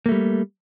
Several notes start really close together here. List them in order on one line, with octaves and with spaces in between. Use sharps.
A#3 A3 G3